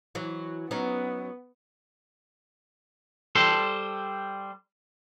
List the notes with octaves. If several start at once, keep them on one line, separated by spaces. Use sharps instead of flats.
E3 F#3
F#3 B3 C#4 D#4
G3 A4 C5 A5 C6